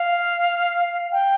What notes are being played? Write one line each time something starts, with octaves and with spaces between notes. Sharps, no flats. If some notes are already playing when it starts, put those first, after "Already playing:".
Already playing: F5
G5